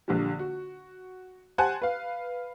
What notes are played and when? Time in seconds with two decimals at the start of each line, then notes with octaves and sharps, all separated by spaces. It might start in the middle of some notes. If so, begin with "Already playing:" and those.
0.08 A#1 D3 G3
0.39 F#4
1.58 G4 C5 F#5 G#5 A5 F#6
1.82 B4 F5